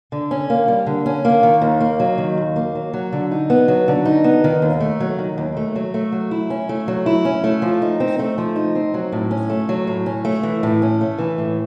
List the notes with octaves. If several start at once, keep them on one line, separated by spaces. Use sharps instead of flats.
D3
C#4
A#3
G3
D3
C#4
A#3
D#3
D#2
A#3
F#3
D#3
D#2
A#3
F#3
F#3
D3
D#4
B3
F#3
D3
D#4
B3
D#3
D#2
A3
F#3
D#3
D#2
A3
F#3
A3
F#3
E4
C#4
A3
F#3
E4
C#4
A3
F3
D#4
C4
A3
F3
D#4
C4
F#3
A2
C#4
A3
F#3
A2
C#4
A3
E3
A2
C#4
A3
E3
A2